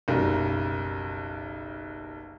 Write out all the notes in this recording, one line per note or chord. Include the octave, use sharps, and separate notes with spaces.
F#1 B1 G3 A#4